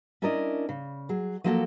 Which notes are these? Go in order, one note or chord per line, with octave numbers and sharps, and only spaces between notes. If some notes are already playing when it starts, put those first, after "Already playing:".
C#4 D4 E4 A#4 D5 D#5
C#3
F#3 G#4
F3 F#3 A#3 F#4 G4 A4